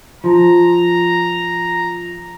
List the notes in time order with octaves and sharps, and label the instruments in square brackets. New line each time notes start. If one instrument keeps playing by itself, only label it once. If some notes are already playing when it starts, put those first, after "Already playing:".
[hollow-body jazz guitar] F3 [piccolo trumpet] A#5